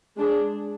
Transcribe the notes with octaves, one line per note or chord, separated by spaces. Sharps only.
G#3 D4 G#4